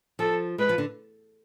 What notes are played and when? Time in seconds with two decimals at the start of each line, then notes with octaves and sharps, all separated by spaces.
0.19 F3 A4
0.58 G#3 B4
0.69 F3
0.78 D3